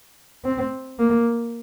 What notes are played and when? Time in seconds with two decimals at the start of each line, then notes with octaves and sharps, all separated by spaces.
0.45 C4
0.99 A#3